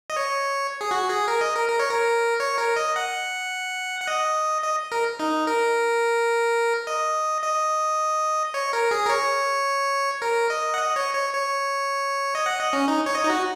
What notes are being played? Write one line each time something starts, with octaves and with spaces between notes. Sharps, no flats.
D#5
C#5
G#4
F#4
G#4
A#4
D#5
A#4
A#4
C#5
A#4
C#5
A#4
D#5
F#5
F#5
D#5
D#5
A#4
D#4
A#4
D#5
D#5
C#5
A#4
G#4
A#4
C#5
A#4
D#5
F#5
D#5
C#5
C#5
C#5
D#5
F#5
D#5
C#4
D#4
C#5
D#5
D#4
F#4